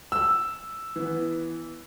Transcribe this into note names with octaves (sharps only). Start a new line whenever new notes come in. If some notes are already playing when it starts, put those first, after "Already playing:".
E6
E3 B3